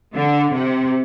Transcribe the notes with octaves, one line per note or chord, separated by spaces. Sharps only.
D3
C3